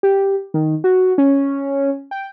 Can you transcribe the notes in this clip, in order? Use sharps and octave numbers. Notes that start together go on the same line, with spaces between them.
G4
D#3
F#4
C#4
G5